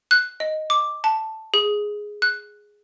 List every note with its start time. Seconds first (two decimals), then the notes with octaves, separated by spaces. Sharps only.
0.11 F#6
0.40 D#5
0.70 D6
1.04 A5
1.54 G#4
2.22 F#6